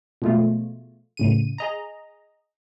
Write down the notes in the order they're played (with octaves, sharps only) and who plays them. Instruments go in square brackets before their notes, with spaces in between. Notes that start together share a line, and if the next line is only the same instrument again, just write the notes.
[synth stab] B2 F3 G#3 A3 F4
A2 C#3 D#7
G#4 D#5 A#5